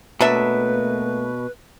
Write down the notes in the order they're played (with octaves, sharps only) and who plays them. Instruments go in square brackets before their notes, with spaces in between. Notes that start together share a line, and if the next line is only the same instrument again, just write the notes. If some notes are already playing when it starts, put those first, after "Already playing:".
[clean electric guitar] B2 [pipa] F#3 D4 E5 [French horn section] A3 A#3 [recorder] B4